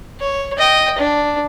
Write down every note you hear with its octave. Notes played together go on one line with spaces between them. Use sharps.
C#5
D#5 G5
D4